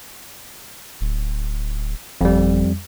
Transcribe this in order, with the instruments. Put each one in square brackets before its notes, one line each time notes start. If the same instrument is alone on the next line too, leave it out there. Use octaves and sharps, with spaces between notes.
[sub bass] D1
[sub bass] G1 [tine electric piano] F2 G3